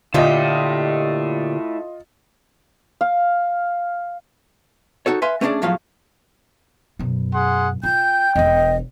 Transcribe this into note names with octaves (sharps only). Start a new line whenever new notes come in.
A#2 D3 E4 F4 G4 A4 D#5
F5
D#4 F#4 A4 C#5
B4 E5 F5 G#5 C6
A3 B3 C#4 D4 G#4 D5
E2 A2 F3 F#3 F4 F5
F#2 B2
G#4 F#5 C6
F4 G5 G6
E1 D4 D#5